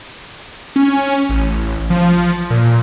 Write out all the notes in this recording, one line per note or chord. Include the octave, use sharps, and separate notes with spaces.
C#4
A1
F3
A#2